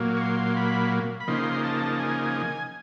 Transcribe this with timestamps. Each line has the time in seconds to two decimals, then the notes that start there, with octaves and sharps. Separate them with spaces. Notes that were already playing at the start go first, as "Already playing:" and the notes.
Already playing: A#2 F#3 A#3
0.17 C#6
0.21 C6
0.57 B5
1.20 B5
1.28 C#3 F3 A#3 D#4 C6
1.64 A5
1.99 G#5